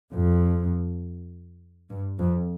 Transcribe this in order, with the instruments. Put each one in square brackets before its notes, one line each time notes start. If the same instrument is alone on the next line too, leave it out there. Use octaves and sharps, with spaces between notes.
[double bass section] F2
G2
F2